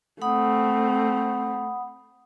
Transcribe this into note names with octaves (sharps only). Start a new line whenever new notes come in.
A3 C4 F#5 B5 D#6